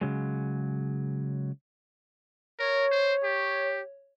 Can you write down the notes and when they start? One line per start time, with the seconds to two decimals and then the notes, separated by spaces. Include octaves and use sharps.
0.01 C#3 F#3 G#3
2.59 A#4 C#5
2.92 C5
3.24 G4